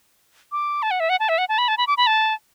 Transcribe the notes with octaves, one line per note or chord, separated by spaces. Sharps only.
D6
A5
F#5
E5
F#5
A5
E5
F#5
A5
B5
A5
B5
D6
B5
A5